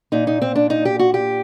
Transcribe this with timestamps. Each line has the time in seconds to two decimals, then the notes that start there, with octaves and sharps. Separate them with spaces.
0.12 A#2 D#4
0.27 D#4
0.41 C4
0.56 D4
0.70 D#4
0.85 G4
0.99 F#4
1.14 G4